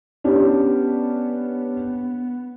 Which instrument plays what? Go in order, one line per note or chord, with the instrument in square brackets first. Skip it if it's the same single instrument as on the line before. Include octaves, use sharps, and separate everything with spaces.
[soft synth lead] B3 [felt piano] C#4 D4 G4